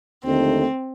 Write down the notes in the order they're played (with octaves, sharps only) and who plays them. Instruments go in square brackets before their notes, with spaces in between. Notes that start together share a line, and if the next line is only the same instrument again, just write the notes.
[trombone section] D#2 D3 F3 A3 D#4 [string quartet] C4